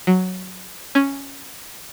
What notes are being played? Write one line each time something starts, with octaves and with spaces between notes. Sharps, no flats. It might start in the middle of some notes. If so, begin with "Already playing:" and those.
F#3
C#4